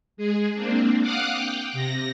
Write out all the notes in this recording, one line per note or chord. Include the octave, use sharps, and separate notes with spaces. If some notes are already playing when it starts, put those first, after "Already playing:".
G#3 G#4
A#3 C4 D4
F5 F#5 D6 D#6 F6 F#6
G5
C3 A#6